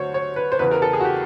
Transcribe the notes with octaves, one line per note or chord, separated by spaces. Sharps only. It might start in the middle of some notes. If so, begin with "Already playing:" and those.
Already playing: D2 D3 F#3 C5 C#5
C#5
B4
C5
E2 C#3 E3 B4
A#4
A4
G#4
F#4
G4